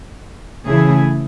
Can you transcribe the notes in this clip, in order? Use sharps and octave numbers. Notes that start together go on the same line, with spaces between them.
C#3 E3 A3 E4 G#4